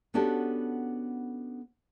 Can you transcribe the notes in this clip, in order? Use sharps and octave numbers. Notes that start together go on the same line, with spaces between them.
B3 C#4 D4 F#4 G4 A4